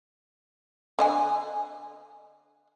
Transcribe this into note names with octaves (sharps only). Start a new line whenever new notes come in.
D3 D#5 G#5